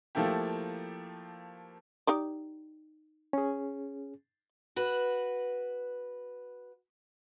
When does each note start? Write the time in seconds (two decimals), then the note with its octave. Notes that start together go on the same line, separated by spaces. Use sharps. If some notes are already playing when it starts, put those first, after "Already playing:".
0.15 F3 A3 A#3 E4 G4
2.07 D#4 G4 D5
3.33 C#4 G#4
4.76 F#4 B4